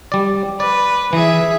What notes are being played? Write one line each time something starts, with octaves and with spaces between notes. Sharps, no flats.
G3 D5
B4 D5
E3 G#4 E5